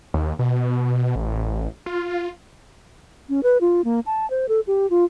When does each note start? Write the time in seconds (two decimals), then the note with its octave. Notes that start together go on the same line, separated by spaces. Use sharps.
0.14 D#2
0.39 B2
1.16 A1
1.86 F4
3.29 C#4
3.43 B4
3.61 F4
3.84 A#3
4.06 A5
4.30 C5
4.49 A4
4.67 G4
4.90 F4